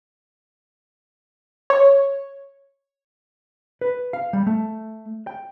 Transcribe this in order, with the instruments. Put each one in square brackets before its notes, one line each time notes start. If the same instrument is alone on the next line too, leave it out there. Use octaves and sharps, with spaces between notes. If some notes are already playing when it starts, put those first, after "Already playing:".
[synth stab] C#5
[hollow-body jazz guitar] B4
F5
G3
A3
G5